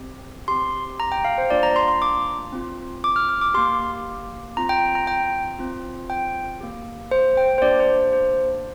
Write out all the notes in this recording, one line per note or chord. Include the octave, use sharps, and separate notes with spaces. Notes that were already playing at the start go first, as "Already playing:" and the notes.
Already playing: C4 G4
C4 G4 C6
A#5
G5
F5
C5
A#3 D4 F4 D5
A#5
C6
C6
D6
C4 F4
D6
F6
F6
D6
A#3 G4 C6
C4 F4 A#5
G5
A#5
G5
C4 F4
G5
A#3 G4
C5
G5
C5
A#3 D4 G4 D5
C5
C5